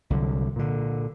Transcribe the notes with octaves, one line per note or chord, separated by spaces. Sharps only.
C2 D3 F#3
A#2 D3